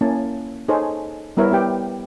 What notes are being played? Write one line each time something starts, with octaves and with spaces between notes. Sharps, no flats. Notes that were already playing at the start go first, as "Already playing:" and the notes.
A#3 C#4 E4 A5
D#4 G#4 A4 C5 C#5
G3 B3 E4 A#4 C#5 E5
B3 G4 G5